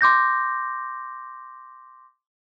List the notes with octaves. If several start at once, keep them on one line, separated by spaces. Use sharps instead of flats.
C6 D6 G6 A#6